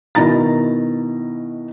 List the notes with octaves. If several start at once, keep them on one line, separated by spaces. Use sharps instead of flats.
B2 D#3 E4 A#5 A6